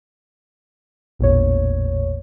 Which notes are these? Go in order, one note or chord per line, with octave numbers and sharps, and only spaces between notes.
A1 E2 A#2 C#5